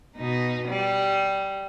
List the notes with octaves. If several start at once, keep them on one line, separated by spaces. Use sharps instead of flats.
B2 D#4
G3